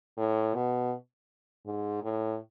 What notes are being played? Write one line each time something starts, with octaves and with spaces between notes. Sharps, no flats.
A2
B2
G#2
A2